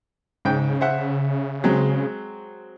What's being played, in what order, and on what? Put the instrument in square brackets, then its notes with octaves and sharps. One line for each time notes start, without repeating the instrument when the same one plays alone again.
[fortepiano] G#2 G5 [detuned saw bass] C#3
[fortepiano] C5 E5 F#5
F#3 G#3 C4